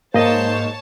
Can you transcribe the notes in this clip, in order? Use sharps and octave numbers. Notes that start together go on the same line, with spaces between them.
G#2 A#3 C5 C#5 D#5 A5